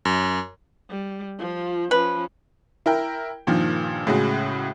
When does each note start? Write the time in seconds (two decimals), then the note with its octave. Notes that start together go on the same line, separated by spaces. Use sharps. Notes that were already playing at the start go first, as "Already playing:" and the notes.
0.05 F#2
0.90 G3
1.39 F3 F4
1.91 F3 C#4 B4
2.86 E4 A#4 G5
3.47 G2 A#2 D#3 F3
4.07 A2 C#3 G#3 F#4